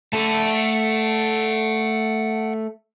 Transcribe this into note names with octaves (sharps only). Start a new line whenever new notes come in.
A3 A4 F#5 A5